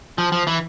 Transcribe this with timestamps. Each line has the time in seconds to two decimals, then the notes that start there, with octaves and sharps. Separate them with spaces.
0.18 F3
0.32 F3
0.47 E3